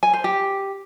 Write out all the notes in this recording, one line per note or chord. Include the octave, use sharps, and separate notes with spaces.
G#5
C5
G4